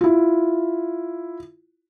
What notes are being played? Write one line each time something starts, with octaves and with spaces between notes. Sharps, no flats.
E4 F4